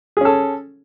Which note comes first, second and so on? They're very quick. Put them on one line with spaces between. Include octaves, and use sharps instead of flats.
G#4 C#4 A4